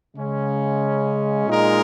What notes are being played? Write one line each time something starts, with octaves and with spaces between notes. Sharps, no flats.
C#3 G#3 C#4
A#2 G#3 D#4 A#4